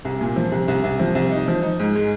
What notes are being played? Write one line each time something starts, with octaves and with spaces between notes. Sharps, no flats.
C2
A#2
F3
C2
C2
C2
F3
C2
D#4
F3
D#4
G#2
G#3